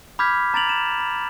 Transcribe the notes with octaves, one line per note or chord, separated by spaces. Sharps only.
B5 D6 F6 G6 G#6 B6
A#5 A6 D7 F7 F#7
E7
B5